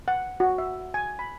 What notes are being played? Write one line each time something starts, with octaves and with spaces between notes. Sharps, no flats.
F#5
F#4
E5
G#5
B5